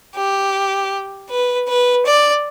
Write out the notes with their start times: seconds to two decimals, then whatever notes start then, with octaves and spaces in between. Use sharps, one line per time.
0.14 G4
1.28 B4
1.67 B4
2.05 D5